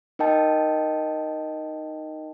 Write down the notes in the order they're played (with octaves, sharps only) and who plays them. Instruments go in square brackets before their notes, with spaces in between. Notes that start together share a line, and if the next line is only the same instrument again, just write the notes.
[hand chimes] D#4 A#4 D#5 G5 A5